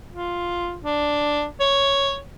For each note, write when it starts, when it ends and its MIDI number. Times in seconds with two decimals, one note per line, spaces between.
0.12 0.76 65
0.83 1.45 62
1.60 2.18 73